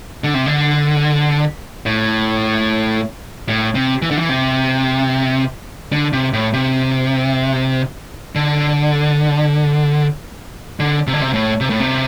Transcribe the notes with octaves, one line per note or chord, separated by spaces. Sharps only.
D3
C3
D3
A2
A2
C3
E3
D3
E3
C3
D3
C3
A2
C3
D3
D3
C3
D3
C3
A2
C3
A2
C3